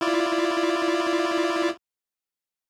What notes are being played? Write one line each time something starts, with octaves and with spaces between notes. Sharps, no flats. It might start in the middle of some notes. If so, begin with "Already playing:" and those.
E4 F4 D5